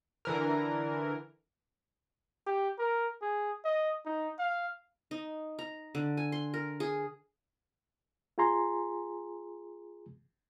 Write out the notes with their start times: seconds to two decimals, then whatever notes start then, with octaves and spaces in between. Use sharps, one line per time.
0.25 D3 E3 A#4
2.46 G4
2.79 A#4
3.21 G#4
3.65 D#5
4.06 D#4
4.39 F5
5.11 D#4
5.59 A#5
5.95 D3
6.17 G#5
6.32 C6
6.54 A#4
6.80 G#4
8.38 F4 G#4 G#5 A#5 C6